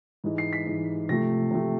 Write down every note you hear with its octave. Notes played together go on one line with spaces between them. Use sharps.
G#2 E3 G#3
C7
B6
G#2 E3 G#3
C3 F3 A3 A#6
C3 F3 A3